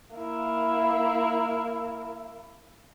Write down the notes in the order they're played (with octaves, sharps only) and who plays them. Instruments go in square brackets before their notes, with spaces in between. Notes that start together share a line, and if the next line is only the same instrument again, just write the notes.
[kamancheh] A#3 E4